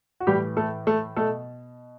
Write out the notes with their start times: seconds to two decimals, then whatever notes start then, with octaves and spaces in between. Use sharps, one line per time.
0.20 F#4
0.27 A2 E3 G3 G4
0.57 A3 A4
0.87 A3 A4
1.16 B2 A3 A4